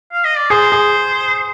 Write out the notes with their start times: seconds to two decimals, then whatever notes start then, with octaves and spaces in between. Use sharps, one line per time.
0.12 F5
0.24 D#5
0.37 D5
0.50 G#4 C5
0.72 G#4